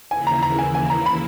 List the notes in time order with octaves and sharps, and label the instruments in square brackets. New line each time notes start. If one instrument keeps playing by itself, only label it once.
[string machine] D#2 C#3 E3 A#3 E4 [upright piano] G#5
[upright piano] A#5
A#5
G#5
G#5
A#5
B5